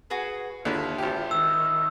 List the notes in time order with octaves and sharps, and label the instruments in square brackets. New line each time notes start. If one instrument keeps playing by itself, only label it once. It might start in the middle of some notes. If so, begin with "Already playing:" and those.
[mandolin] F#4 G#4 B4
[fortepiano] D#2 D3 [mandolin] E4 [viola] F4
[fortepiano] G#1 G4
[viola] D#3 [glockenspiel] E6